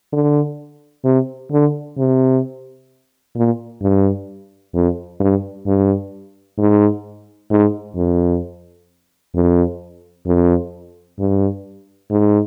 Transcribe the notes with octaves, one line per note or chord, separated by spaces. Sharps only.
D3
C3
D3
C3
A#2
G2
F2
G2
G2
G#2
G#2
F2
F2
F2
G2
G#2